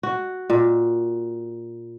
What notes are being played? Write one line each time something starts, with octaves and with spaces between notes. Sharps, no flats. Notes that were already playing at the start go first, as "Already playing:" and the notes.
F#4
A#2